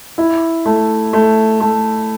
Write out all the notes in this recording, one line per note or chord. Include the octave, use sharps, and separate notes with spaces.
E4
A3
A3
A3